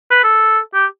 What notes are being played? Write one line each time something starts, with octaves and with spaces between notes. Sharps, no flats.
B4
A4
G4